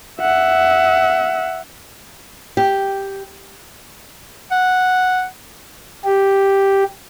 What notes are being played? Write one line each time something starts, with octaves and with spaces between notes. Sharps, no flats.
E5 F#5
G4
F#5
G4